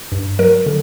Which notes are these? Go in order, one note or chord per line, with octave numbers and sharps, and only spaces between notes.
G2
F#3 A#4
D3